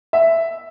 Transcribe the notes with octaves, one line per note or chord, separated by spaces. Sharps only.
E5